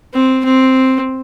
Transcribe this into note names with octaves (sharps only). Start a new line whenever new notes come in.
C4
C4